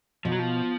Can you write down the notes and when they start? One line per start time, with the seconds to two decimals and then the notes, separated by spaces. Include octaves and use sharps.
0.25 B2 F3
0.32 F#3
0.39 F3